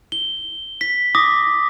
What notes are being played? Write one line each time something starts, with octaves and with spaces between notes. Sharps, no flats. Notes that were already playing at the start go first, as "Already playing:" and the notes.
G7
B6
D6 D#6 A#6